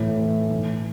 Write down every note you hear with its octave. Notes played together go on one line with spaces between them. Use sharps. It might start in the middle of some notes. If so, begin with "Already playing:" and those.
Already playing: A2 E3
E3
A2